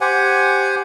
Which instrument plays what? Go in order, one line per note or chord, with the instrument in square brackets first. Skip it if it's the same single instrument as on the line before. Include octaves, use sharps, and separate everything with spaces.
[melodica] G4 C5 F#5 G#5